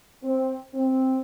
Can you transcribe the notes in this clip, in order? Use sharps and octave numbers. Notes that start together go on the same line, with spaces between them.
C4
C4